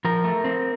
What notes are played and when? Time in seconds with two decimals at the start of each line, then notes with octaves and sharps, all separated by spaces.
0.05 F3 A#4
0.24 A3
0.44 C4